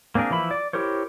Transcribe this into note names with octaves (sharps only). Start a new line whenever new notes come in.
A#3 C4 D4 G#4 A#4
E3 F3 E4 B5
D5
E4 G4 A#4 C5 C#5